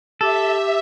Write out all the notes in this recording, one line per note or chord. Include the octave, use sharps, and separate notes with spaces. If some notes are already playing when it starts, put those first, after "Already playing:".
G4 A4 E5